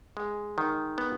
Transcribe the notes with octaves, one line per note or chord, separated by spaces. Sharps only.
G#3
D#3
B3